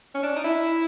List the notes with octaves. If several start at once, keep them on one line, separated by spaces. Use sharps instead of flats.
C#4
D4
D#4
E4